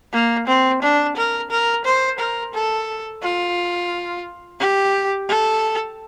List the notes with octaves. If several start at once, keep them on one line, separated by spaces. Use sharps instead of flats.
A#3
C4
D4
A#4
A#4
C5
A#4
A4
F4
G4
A4